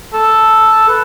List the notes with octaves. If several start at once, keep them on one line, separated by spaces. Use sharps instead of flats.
A4
B4